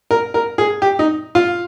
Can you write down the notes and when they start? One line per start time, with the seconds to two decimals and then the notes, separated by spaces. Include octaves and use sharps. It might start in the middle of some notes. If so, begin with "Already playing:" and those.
0.11 A#4
0.34 A#4
0.58 G#4
0.82 G4
0.99 D#4
1.35 F4